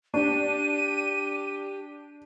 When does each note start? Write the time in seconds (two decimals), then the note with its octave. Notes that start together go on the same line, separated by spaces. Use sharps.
0.14 D4 G4 D#7